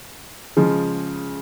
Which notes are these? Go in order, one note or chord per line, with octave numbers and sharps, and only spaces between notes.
C#3 F3 G#3